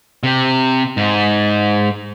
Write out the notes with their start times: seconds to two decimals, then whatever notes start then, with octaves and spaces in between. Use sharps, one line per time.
0.23 C3
0.97 G#2